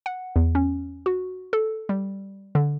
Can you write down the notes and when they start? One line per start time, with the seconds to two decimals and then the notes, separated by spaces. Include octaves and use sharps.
0.06 F#5
0.36 E2
0.55 C#4
1.06 F#4
1.53 A4
1.89 G3
2.55 D3